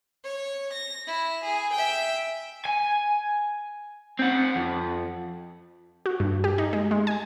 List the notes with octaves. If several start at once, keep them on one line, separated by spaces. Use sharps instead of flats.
C#5
A#6
E4
G#4
E5 G5
G#5
C4 F#5
F2
F#4
G2
G4
D#4
G#3
G#3
G#5